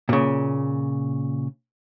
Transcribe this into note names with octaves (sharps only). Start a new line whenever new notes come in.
A#2 C#3